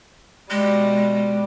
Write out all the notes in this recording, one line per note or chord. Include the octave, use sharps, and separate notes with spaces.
B2 G3 G#3